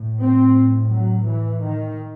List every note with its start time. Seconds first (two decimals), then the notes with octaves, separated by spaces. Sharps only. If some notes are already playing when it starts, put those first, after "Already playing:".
Already playing: A2
0.22 C4
0.92 F#3
1.27 E3
1.63 D#3